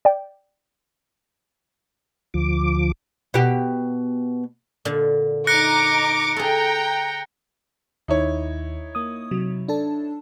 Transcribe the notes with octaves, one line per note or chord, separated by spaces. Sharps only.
D5 G5
D2 F3 D6
B2 G4
A#2 D3
D#4 A#5 D6 F#6 A#6 C#7
G#4 A4 G5 A#5
D#2 D#4 E4 C#5
A#3 D#6
C3 F#3
D4 A4 A5